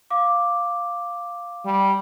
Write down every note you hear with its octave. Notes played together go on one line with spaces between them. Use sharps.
F5 D6
G3